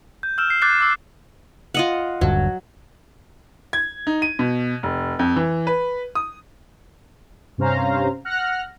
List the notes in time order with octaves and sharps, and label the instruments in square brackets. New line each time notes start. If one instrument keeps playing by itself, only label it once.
[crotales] G6
E6 F6 G6 E7
C7
D6 F#6 G6 A6 C7
D6 E6 C7
[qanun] F4 D#5 F#5
[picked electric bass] D#1 G2 D3 [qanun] F#3
[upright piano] G#6
D#4
D#7
B2
F1
F2
E3
B4
D#6
[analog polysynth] G2 C3 C#4 C5 F5 A#5
F#5 F6 F#6 A#6